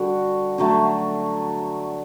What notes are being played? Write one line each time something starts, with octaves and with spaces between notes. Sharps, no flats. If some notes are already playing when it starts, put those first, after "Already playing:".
Already playing: D3 G3 F#4
D3 F#3 A3